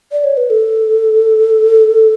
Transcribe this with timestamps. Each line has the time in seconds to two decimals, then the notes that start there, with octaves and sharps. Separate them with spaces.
0.12 D5
0.24 C#5
0.37 B4
0.50 A4